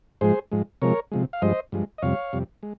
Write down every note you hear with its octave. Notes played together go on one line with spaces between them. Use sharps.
G#2 F3 G#3 G#4 C5
G#2 F3 G#3
C3 F3 G#3 A#4 C#5
C3 F3 G#3
F5
G2 F3 G#3 C5 D#5
G2 F3 G#3
D#5
F2 C3 G3 C#5 F5
F2 C3 G3
G#3